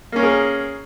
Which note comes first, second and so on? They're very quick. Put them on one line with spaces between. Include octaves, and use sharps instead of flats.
A#3 C#4 A#4 G#4